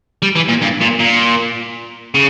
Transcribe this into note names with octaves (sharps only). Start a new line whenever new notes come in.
G3
E3
A#2
G2
A#2
A#2
C#3